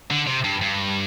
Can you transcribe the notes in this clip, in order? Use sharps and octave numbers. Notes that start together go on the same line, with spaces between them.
D3
C3
G2
G2